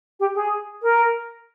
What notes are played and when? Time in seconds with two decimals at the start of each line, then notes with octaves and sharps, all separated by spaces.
0.20 G4
0.35 G#4
0.83 A#4